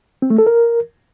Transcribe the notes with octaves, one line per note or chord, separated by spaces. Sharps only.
C4
A3
A4
A#4